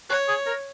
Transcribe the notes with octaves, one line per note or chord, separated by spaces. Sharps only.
F#4 C#5
G#4
A#4